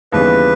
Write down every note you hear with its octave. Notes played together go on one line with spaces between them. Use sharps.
D#2 C#3 E3 G3 B3 B4